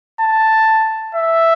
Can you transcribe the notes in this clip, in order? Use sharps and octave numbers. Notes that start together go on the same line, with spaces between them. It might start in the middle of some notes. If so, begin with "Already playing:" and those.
A5
E5